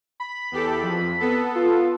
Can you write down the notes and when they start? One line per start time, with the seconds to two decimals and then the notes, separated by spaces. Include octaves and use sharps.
0.20 B5
0.52 E2 G4 A4
0.82 F2
1.20 B3 A4
1.55 F4